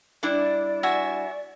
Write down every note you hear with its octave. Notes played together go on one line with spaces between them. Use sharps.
G3 D4 E4 D5
F#4 E5 G#5